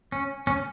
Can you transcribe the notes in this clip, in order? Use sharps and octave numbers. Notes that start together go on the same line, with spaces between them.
C#4
C#4